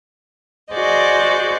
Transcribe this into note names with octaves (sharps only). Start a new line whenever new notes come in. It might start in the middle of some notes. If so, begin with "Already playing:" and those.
F#4 G#4 C5 D5 D#5